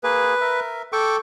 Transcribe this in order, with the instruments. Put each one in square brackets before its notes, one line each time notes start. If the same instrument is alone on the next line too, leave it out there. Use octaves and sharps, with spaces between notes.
[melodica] A#3 G#4 [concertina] B4
[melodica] A#4 E5
[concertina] A4 [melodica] G5 C#6 D6